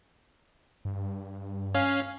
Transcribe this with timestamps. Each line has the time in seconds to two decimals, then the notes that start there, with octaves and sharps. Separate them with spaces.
0.85 G2
1.74 C#4 F5